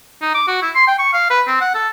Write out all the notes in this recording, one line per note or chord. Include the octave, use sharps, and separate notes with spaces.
D#4
D6
F#4
E4
C6
G5
C#6
F5
B4
C4
F#5
A4